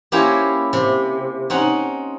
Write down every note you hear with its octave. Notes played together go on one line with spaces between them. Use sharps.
A#3 C#4 E4 G4 C5 C#5
C3
C4 C#4 D#4 F#5